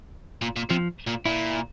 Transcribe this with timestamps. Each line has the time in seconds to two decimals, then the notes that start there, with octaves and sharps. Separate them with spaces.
0.42 A#2
0.56 A#2
0.70 C3 F3
1.07 A#2
1.26 A#2 E4